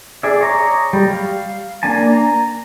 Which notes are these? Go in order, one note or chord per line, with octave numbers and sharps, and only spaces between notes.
G#4 D5 E5
C#5 D#5 A#5 D6
G3
F5
A#3 D4 G#5 A5
A#5